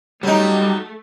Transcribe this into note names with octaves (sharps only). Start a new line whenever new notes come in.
F#3 G3 A3 D#4